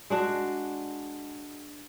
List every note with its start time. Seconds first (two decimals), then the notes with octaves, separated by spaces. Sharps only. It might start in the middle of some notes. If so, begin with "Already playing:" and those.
0.10 G#3 D4 F#4